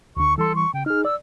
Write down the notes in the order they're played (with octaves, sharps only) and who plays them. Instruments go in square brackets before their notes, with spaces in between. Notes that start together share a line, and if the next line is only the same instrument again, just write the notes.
[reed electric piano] D2 D3 [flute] C#6
[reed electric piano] E3 G3 C6 [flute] A4
[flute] C#6
[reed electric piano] C#3 [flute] G5
[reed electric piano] D#4 G#4 [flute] F6
[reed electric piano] D5 [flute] E6